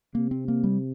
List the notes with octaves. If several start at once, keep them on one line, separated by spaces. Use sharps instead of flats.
C3 A#3
C4
A#3
G3